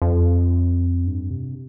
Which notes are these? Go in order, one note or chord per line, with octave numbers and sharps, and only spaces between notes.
F2
G2
C3